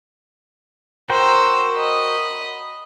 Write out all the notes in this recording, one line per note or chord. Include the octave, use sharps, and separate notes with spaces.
F#4 A#4 C5 G5 E6
D#5 B5